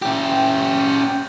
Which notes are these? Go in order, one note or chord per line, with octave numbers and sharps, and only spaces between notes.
C#4 G4